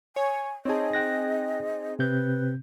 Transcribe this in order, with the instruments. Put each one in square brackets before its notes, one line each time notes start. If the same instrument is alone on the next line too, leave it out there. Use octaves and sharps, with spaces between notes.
[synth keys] C#5 [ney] G#5
[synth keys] C4 D#4 G#4 [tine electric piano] C#5 A5 [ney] D#5
[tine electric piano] G5 F#6 A#6
[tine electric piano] C3 C4 G6 [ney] B4